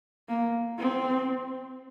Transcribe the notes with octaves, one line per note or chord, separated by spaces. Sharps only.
A#3
C4